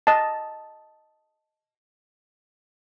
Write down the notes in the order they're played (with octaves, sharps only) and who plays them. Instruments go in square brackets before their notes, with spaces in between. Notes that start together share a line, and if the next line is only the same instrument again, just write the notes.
[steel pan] D#5 A5